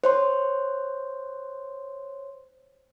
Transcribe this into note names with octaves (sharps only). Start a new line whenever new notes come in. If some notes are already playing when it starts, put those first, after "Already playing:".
C5 C#5 C6